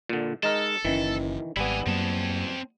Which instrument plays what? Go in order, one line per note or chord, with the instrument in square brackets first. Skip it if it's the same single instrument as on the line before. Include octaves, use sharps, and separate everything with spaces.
[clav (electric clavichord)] A#2 D3
[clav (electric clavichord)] G#3 D#4 A#4 [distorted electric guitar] A4
[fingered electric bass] F#1 C#4 [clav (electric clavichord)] D#3 E3
[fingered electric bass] G#1 [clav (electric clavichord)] G3 B3 [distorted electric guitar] E4 G#5
[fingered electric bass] F#2 F#3 A#3 [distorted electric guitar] C4 A5